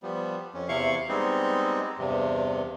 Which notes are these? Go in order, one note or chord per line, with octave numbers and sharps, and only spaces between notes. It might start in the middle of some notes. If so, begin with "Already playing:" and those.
F3 G3 B3
F2 C#4
E2 C3 E4 F5 C#6
G3 G#3 B3 C4 D#4
E2 G2 C3